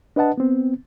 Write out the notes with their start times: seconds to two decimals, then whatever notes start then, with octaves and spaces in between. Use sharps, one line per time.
0.16 D4 B4 D#5 F#5 A5
0.38 B3 C4